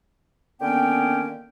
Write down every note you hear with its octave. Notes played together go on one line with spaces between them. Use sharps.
D3 D#3 A#3 B3 C#4 G5